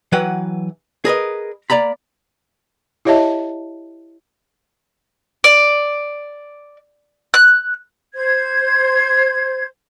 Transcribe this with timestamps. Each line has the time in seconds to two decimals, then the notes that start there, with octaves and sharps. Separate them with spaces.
0.12 E3 F#3 B4 F#5 G5
1.05 G#4 A#4 B4 D#5
1.70 A#3 D5 A#5 B5
3.05 E4 G4 C#5 D#5 E5 A5
5.44 D5
7.34 F#6
8.15 C5 G#6